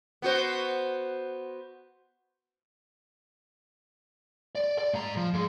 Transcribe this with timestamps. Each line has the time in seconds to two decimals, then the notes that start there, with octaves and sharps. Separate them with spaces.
0.22 B3 F#4 C5
4.55 D5
4.79 D5
4.93 G#2 A#5
5.17 F3
5.33 G#2 G#3